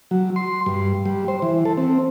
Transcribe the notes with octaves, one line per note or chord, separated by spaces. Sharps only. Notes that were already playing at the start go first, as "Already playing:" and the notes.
F#3
C6
G2
G3
C5
E3
A4
C4